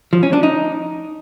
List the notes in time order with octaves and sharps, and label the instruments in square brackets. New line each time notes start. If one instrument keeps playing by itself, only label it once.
[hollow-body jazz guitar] F3
C#4
D4
D#4